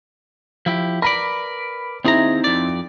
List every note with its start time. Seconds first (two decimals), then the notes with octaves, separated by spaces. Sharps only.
0.66 F3 E4 G4
1.02 A#4 B4 D5 B5
2.05 D#2 C4 D#4 E4 G#4 A#5
2.44 F2 D5